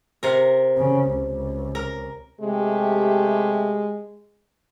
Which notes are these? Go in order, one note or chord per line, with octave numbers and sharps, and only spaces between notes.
C3 A#4
C#3
C#2
A#4
C3 G#3 A3 G4